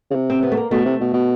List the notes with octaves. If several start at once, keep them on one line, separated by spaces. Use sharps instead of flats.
C#3
C3
C4
B3
A3
A#3
B2 A3
C3
B2
B2